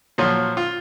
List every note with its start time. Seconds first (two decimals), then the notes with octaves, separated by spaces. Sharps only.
0.18 A#2 F3 F#3
0.57 F4